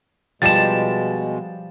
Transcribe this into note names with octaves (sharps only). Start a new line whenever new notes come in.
B2 F3 G3 G#3 A6 E7